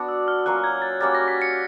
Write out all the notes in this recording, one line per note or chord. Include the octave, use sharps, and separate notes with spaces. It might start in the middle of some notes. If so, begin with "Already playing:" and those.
Already playing: B3 D4 F#4
E6
F6
F#3 A#3 C#4 F4 F#6
G#6
A6
G3 A#3 C#4 F#4 A6
A#6
B6
C#7